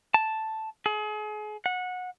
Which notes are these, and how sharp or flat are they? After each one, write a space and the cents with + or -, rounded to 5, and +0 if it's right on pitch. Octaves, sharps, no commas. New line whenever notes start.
A5 +0
G#4 +35
F#5 -20